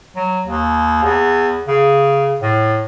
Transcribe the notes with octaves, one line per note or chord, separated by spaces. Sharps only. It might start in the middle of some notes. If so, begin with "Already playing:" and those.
F#3
D#2
E2
C#3
A2